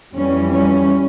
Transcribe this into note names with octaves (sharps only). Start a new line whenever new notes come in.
F2 E3 G3 C#4
C#4